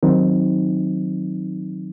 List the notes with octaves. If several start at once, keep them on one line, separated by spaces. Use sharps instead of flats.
D#3 F#3 C4 D#4